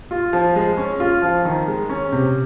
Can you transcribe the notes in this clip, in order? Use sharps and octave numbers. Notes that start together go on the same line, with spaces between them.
F4
F3
G#3
C#4
F4
F3
D#3
G#3
C#4
C3